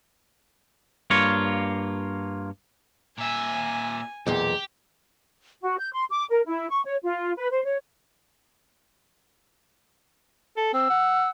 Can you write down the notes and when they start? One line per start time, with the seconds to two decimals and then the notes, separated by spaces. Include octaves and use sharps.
1.10 G2 A#3 F4 C#5
3.18 A#2 E5 G#5
4.26 B1 E2 A#2 G4
5.61 F#4
5.79 G6
5.92 C6
6.10 D6
6.29 A#4
6.46 E4
6.70 C#6
6.85 C#5
7.03 F4
7.37 B4
7.51 C5
7.64 C#5
10.57 A4
10.74 C4 E6
10.90 F#5